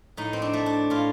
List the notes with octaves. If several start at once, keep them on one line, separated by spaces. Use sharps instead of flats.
A2 D#4
C4
D4
A3
D4
A2 F4